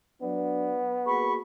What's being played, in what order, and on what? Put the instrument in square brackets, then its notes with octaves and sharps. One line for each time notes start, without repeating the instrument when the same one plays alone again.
[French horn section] F#3 D4 D5 [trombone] B3
[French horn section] A#3 F#4 G#4 [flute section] B5 C#6